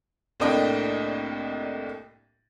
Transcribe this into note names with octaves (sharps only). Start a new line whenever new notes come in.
C2 A2 A#3 D4 D#5 G5